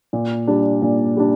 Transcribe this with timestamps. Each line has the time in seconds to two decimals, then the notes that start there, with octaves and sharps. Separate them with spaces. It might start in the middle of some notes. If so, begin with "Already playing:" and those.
0.13 A#2
0.47 G3 D4
0.82 A#2
1.17 G3 D4